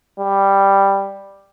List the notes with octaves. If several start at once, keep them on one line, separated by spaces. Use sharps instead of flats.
G3